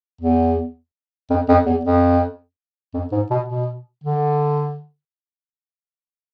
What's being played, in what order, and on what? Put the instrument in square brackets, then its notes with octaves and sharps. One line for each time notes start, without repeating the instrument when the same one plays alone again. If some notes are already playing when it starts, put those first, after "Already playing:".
[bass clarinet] E2
F2
F2
E2
F2
F2
G#2
B2
B2
D3